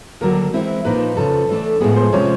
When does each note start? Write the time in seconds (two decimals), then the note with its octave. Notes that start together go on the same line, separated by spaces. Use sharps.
0.21 D#2 D3 F#3 A#4
0.53 E3 G#3 C4 E4
0.85 A#2 F3 A#3 D#4 B4
1.17 F2 C#3 F3 A4
1.49 E3 A3 D4
1.80 A2 F3 G#3 B3 G#4
1.96 C5
2.13 C3 F3 G#3 C#4 C#5